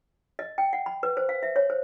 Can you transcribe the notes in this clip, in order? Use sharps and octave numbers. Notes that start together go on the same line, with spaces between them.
D#5
G5
F#5
B5
B4
C5
F5
E5
C#5
C5